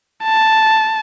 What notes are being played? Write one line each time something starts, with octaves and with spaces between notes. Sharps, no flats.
A5